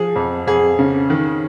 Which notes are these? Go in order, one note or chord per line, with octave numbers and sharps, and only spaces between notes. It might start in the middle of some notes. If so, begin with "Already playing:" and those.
Already playing: F3 G#4
F2
F2 G#4
C#3
D#3